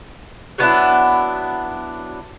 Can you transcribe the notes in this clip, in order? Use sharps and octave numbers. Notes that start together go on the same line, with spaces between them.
F#3 B3 D4 E4